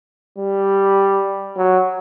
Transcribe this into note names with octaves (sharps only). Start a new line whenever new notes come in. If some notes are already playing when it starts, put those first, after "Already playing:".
G3
F#3